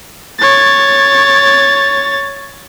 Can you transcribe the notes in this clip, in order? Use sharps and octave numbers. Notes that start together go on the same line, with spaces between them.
C#5 A6